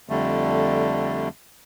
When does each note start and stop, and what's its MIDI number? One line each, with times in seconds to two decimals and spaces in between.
0.09 1.28 41
0.09 1.28 50
0.09 1.28 55
0.09 1.28 57